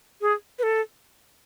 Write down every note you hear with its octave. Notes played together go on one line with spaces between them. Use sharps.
G#4
B4
A4